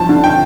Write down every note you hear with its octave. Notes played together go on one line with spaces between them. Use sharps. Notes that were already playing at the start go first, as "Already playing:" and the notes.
Already playing: G1 F3 A5
D3
G5